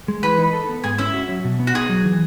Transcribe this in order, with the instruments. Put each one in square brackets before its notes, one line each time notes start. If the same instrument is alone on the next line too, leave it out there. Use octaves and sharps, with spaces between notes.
[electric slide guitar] G#3
[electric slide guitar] E3 [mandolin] B4 B5
[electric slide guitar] D#4
A4
B3
[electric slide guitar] G#2 [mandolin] G#4 G#5
[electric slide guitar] C#4 [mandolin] E4 E5
[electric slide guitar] F#4
F#3
B2
B3
[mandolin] F#4
[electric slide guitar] D#4 [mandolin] G#4
[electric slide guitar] F#3
E3